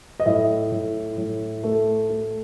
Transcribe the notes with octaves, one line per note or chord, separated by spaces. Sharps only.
D#5
A2 E5
A2
A2
A3
A3